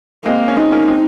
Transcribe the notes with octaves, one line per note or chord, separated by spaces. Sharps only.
G#3 A#3 C4
C#4
G#3 C4 D#4
A#3 C#4
G#3 C4